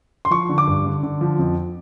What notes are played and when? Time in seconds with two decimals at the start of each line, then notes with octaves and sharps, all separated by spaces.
0.25 C6
0.31 F3 C#6
0.49 D3
0.58 D6
0.67 G2
0.86 D3
1.03 D3
1.21 F3
1.39 F2